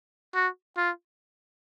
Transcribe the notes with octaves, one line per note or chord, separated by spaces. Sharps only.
F#4
F4